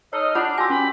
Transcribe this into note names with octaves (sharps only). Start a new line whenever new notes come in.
D#4 A4 C#5 D#5 F6
D4 F4 C#5 F#5 F7
F#4 G4 G#5 A5 E6 A#6
C#4 B5